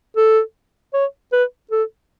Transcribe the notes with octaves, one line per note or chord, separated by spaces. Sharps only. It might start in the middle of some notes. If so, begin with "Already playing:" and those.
A4
C#5
B4
A4